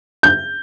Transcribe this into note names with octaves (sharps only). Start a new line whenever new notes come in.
G6